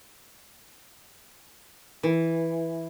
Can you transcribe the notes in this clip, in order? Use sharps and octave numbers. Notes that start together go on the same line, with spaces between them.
E3